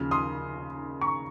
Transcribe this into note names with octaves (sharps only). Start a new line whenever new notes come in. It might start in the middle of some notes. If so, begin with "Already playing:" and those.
Already playing: D#2 C#3 F3 F6
C6 D#6
A#5 C#6